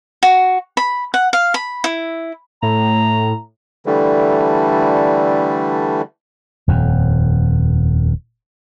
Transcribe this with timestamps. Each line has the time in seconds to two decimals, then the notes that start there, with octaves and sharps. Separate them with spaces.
0.23 F#4
0.77 B5
1.14 F#5
1.33 F5
1.54 B5
1.84 E4
2.63 A2 A#5
3.86 D3 E3 G3 A3
6.68 D#1 F2